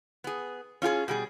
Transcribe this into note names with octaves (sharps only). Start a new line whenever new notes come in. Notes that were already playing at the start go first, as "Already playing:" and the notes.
B3 G#4
C#4 F4 G4 G#4
B2 G3 G#4